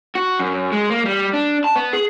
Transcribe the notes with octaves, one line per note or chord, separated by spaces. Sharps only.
F#4
F#2
G#3
A#3
G3
D4
A5
B3
G#4